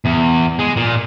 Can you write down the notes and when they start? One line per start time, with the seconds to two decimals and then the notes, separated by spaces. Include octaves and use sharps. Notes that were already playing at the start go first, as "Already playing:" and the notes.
0.06 E2
0.59 G#3
0.77 A#2